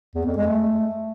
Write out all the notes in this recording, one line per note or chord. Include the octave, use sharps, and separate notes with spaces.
E2
F2
G#3
A3